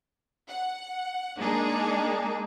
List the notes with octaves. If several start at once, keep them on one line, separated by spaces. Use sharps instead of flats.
F#5
G#3 A#3 D4 D#4 G#4